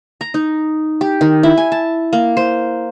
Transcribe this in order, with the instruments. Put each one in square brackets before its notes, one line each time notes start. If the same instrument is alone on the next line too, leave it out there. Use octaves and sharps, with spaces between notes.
[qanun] A#5
D#4
G4
D#3
E4
G#5
A5
A#3
C5